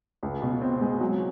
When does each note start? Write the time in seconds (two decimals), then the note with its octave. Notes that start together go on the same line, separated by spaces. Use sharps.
0.23 C#2
0.42 B2
0.62 C4
0.81 G#3
1.00 F#3